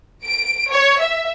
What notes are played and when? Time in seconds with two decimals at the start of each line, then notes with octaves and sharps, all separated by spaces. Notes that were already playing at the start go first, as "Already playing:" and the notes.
0.24 D7
0.70 C#5
1.00 E5